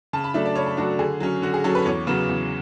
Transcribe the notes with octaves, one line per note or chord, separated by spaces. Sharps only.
C#3 A5
B5
F#3 A3 D4 E5
D5
C#3 C#5
A4
F#3 A3 D4 F#4
D3 G#4
F#3 C#4
D3 F#4
G#4
F#3 C#4 A4
B4
E2 C#5
C#3 F#3 B3
E2